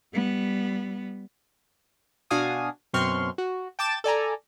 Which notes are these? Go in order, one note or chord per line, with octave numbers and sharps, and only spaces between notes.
G3 B3
B2 D4 F#4 F5 G#5 D#6
F#2 B2 C4 C6 C#6 F6
F#4
G5 A5 D6 A6 E7
A4 D5 G#5 A#5